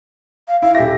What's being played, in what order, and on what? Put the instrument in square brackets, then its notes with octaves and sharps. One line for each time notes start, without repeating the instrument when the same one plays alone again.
[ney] F5
[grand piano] E4 [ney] F5
[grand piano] D#1 G4 A#6 [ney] E5